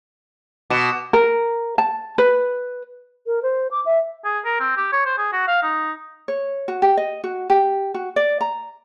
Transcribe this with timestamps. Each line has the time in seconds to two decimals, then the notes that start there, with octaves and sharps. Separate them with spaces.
0.70 B2 D6 E7
1.13 A#4
1.78 A5
2.18 B4
3.27 A#4
3.43 C5
3.71 D6
3.86 E5
4.25 G#4
4.45 A#4
4.60 C4
4.77 G4
4.92 C#5
5.06 C5
5.18 G#4
5.33 F#4
5.48 F5
5.63 D#4
6.28 C#5
6.68 F#4
6.82 G4
6.97 D#5
7.24 F#4
7.50 G4
7.94 F#4
8.16 D5
8.41 A#5